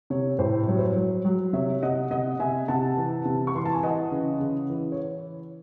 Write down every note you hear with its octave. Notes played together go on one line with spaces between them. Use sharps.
C3 C#5
A2 C5
F#3 C#5
C5
C#5
F#3
F#3
C3 C#5 E5
C3 D#5 F#5
C3 D#5 F#5
C3 E5 G#5
C3 F#5 A5
E3
C3
C#6
E3 C6
A5
G#5
E3 D#5 F#5
C#3
C#3
E3
C#5